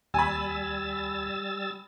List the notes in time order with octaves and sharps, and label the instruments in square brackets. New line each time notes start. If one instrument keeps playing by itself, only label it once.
[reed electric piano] D#2 [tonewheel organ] G3 E6 A6 [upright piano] G#5 B5